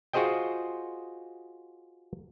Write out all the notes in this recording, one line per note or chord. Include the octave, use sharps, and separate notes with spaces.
F4 F#4 G#4 C5 D#5 G5